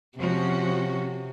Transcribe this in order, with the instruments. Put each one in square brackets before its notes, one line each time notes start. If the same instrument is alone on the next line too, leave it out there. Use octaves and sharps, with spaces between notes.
[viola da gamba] C3 [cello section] F3 C#4 F#4